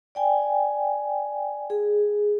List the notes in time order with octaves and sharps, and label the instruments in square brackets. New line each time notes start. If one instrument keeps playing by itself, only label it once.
[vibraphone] D5 G5 G#5
G#4